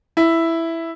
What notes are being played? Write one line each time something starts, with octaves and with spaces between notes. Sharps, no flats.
E4